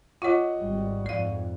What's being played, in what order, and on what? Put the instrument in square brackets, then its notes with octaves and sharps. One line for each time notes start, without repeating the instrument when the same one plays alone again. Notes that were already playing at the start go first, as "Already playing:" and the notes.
[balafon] F4 C#5 [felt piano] D#5 F#5 C#6
[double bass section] G#1 G3
[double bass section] F2 G#2 [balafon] D5 F5